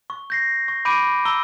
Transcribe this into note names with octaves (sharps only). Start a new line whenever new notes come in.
C#6
G6 A#6 C7
C#6
B5 D6 G6 D7 D#7
A#5 E6 G7